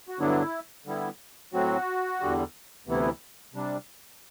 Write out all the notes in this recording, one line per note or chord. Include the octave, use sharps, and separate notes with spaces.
F#4
G2 D3 F#3 B3 D4 E4
D3 G3 B3 E4
A2 F#3 C4 F#4
E2 D3 G3
D2 C3 E3 B3 E4
C3 G3 D4